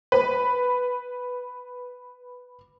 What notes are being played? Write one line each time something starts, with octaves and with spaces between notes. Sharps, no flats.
B4 B5